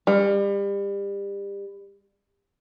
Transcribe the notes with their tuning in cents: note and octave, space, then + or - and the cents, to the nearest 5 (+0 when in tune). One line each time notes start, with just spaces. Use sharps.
G3 +30